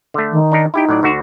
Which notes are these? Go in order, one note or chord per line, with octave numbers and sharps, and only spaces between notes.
D3 A3
D#3
D4 D#4 A#4
D#4 E4 G4 G5
A2 F#3 D5
D2 D3 F#4